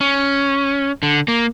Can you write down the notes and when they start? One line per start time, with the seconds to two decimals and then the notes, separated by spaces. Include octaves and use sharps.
0.01 C#4
1.03 D3
1.28 A#3